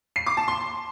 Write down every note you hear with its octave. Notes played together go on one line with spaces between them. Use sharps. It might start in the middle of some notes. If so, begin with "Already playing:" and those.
C7
D6
A5
C6